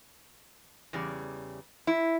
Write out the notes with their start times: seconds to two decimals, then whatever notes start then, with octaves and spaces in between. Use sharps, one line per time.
0.93 E2 C#3 G3
1.87 E4